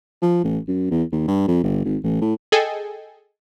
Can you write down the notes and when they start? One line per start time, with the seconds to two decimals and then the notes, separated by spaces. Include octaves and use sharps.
0.22 F3
0.44 A1
0.68 F#2
0.91 E2
1.12 D#2
1.28 G2
1.48 F2
1.63 G1
1.85 G#1
2.03 A1
2.21 A2
2.52 G#4 A4 D#5 G5 G#5